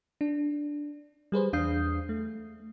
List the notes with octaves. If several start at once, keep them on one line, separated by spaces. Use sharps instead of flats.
D4
G3 G#4 B4 C5
E2 D4 F5 D#6 G6 C7
A3